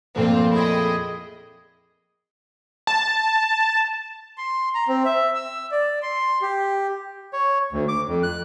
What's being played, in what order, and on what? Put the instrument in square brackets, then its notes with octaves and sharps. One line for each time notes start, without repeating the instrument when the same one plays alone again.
[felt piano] F2 A#2 A#3 [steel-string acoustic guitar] A3 A4 [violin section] C4 F4
[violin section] E4 D#5 G5 [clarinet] G#4
[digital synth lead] A5
[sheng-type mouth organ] C6
A#5
C4
E5
E6
D5
C6
G4
[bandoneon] C#5
D2
D6
F2
F#6